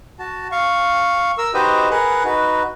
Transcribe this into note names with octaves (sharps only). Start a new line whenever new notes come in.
F#4 A5
F5 C#6
A#4 E6
D#4 F#4 G4 B4 C5 D#5
G#4 A#4 B4 F#5
D#4 F#4 B4